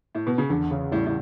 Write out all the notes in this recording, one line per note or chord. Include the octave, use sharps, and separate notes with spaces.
A2
B2
C#3
E2 D3
C#3
A2 G3
A2